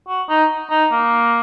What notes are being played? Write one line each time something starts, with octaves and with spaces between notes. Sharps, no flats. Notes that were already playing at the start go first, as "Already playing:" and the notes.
F#4
D#4
D#4
A#3